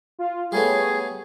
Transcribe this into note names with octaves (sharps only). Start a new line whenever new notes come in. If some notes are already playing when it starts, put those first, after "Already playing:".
F4
G3 A3 B3 G#4 C#5